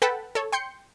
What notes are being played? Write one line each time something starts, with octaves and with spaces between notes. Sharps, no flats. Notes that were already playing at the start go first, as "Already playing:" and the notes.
A4 B4 F#5 G5 A5 B5
A4 C#5
G5 C6 G6 C#7